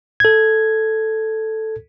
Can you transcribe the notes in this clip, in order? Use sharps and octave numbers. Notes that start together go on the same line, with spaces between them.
A4 G#6